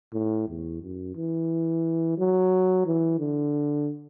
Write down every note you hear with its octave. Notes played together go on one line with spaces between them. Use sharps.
A2
E2
F#2
E3
F#3
E3
D3